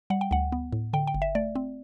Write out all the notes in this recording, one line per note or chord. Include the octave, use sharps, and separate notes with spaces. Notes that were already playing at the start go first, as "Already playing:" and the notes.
G3 F#5
G5
D2 F#5
B3
A2
D3 G5
G5
G1
E5
A3 D5
C4